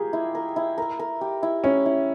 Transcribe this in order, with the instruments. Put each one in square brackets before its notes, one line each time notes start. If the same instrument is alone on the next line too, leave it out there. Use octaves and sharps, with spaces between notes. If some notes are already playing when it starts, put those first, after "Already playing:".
Already playing: [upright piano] F4 G4 G#4 [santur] A#4
[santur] E4
A#4
E4
A#4
A#4
G4
E4
[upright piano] C#4 [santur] E4
[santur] E4